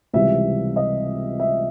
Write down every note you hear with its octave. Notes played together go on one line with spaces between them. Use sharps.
C#2 C3 E3 G3 C4 E5
D#5
E5